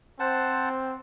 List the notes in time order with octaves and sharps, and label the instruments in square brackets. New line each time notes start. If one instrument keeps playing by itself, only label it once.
[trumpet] C4 [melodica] C5 F#5 A5